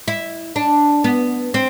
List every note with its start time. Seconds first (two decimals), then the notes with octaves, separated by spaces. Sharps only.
0.08 E4
0.56 D4
1.04 B3
1.54 C4